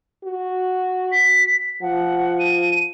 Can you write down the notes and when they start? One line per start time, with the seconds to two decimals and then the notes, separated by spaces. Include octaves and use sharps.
0.24 F#4
1.12 B6
1.82 F3 F#5
2.39 D#7